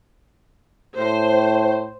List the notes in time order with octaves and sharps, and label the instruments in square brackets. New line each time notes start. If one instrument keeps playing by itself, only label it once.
[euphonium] A2 [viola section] C5